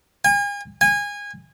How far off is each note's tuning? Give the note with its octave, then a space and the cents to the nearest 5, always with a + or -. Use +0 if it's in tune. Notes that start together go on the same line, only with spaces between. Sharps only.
G#5 -40
G#5 -25